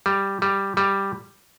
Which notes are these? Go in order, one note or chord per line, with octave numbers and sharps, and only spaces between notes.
G3
G3
G3